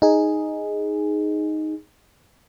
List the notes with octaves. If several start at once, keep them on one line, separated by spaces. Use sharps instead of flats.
D#4 G#4